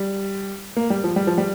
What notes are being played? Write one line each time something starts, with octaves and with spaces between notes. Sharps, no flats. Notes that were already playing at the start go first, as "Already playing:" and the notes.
Already playing: G3
A#3
G3
F3
G3
F3
G3